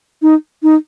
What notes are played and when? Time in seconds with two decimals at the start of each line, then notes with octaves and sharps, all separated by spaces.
0.22 D#4
0.63 D#4